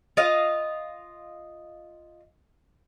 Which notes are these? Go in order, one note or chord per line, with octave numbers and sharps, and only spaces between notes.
F4 D#5 F5